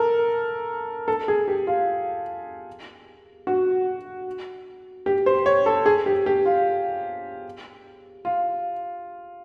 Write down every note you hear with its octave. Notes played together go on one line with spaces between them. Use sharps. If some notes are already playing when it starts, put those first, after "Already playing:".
Already playing: A4 A#4
A4
G#4
G4
F4
F#4
G4
C5
C#5
A4
G#4
G4
G4
F4
F4